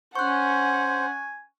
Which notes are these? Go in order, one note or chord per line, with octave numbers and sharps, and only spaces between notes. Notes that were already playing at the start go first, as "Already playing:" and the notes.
C#4 C5 F#5 G#5 C#6 F#6